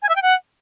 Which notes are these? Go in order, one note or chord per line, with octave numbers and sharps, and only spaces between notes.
G#5
E5
G5
F#5